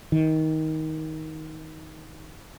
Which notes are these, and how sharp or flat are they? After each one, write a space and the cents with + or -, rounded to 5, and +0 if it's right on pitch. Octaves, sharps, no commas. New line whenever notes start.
D#3 +20